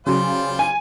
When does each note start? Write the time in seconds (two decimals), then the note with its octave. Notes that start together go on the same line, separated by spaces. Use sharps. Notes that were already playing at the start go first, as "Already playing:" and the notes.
0.06 C#3 F#3 G3 F4 C5
0.59 G#5